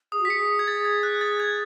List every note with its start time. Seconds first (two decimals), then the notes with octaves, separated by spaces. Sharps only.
0.12 G#4 D#6
0.21 F#4
0.25 B6
0.29 G#4 C#7
0.59 G#6
0.67 G#4 A6
0.85 G#6
1.03 F#6
1.21 A6
1.40 G#6